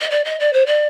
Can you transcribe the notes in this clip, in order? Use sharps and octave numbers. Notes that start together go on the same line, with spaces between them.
D#5
D5
D#5
D5
C5
D5